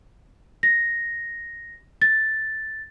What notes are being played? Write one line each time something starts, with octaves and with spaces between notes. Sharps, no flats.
A#6
A6